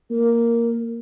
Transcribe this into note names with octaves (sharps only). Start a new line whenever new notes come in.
A#3 A#4